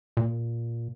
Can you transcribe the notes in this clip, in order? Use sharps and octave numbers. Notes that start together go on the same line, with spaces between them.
A#2